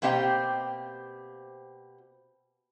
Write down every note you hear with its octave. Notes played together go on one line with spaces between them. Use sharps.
B2 A#3 C4 G4 D#5 G5